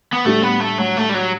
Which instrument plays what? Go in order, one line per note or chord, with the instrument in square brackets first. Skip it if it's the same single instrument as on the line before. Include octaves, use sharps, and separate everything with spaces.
[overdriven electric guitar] B3
[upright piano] A2 G3 D4 G4 [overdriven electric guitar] A3
[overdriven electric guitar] B3
A3
F#3
A3
G3
F#3